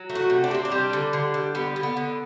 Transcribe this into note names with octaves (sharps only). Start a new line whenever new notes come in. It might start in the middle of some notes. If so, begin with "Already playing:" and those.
Already playing: F#3
A3
F#4
C3
D4
C3 C4
D4
G3
D3
D3
G3
G3 B3
D3
B3
D3